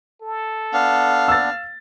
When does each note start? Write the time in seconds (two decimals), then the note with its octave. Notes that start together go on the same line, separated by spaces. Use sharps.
0.22 A4
0.73 B3 D4 F5
1.28 E6 A6